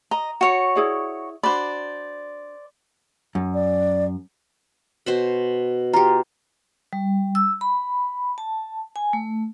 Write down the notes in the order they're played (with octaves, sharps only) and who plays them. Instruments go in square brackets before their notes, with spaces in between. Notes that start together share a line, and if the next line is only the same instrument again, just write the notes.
[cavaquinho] D#5 [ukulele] A#5
[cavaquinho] F#4 C#5
[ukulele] E4 G#4 D5
[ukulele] D4 F#4 B5 [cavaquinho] C5 D5
[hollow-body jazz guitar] F#2
[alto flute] D5
[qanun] B2 C5 B5
[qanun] F4 G4 [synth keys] A#5
[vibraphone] G3
E6
B5
A5
G#5
A3